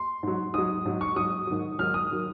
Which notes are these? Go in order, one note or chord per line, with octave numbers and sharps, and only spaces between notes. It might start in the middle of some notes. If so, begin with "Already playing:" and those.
Already playing: C6
G#2 F#3
G#2 F#3 D#6
G#2 F#3
C#6
G#2 F#3 D#6
G#2 D#3 F#3
G#2 D#3 F#3 F6
D#6
D#3 F#3